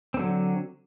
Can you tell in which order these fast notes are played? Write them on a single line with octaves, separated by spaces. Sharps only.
C4 D3 F#3